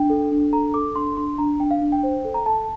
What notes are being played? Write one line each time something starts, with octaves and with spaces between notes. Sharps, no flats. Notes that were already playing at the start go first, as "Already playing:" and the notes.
Already playing: D4 G5
A4
D4
A4 A#5
A4 D6
D4 C6
D4 C6
D4 A#5
D4 G5
F5
D4
G5
C5
A4
A#5
A4 A5